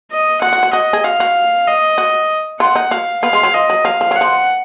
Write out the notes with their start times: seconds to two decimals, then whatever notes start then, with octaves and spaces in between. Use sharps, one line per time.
0.11 D#5
0.41 F#4 F#5
0.53 F#4
0.63 F#4
0.73 F#4 D#5
0.93 G#4
1.04 F#4 F5
1.20 F#4
1.67 D#5
1.98 F#4
2.60 F4 F#5
2.76 D#4
2.91 F#4 F5
3.23 B3 F5
3.33 G#3
3.43 F#3
3.54 F3 D#5
3.70 F#3
3.85 F#3 F5
4.01 F3
4.11 F#3
4.16 F#5
4.21 F3